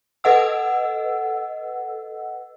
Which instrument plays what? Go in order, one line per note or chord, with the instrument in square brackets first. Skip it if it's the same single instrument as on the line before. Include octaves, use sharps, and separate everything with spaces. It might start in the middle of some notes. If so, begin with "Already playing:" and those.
[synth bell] A4 B4 D#5 F#5 E6